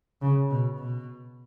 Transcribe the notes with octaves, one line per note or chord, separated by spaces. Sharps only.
C#3
B2
B2